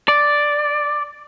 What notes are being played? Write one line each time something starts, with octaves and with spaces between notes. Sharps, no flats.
D5